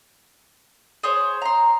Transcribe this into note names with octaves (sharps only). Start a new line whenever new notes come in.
G#4 C5 C#5
A#5 C6